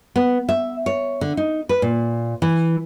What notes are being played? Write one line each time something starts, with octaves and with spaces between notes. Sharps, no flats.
B3
E5
C#5
D3
D#4
B4
A#2
E3